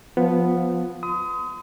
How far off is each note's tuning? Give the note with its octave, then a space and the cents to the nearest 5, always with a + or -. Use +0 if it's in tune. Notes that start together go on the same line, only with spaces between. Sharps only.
F3 +15 B3 +0 F4 +0
C6 -40 D#6 +25